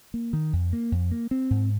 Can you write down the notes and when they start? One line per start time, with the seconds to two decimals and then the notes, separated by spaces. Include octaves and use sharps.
0.14 A#3
0.33 D#3
0.53 F2
0.73 A#3
0.92 F2
1.11 A#3
1.31 C4
1.50 G#2